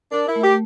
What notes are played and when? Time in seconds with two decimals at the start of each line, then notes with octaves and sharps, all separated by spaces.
0.11 D4 A#4
0.28 E4
0.36 A3
0.43 G4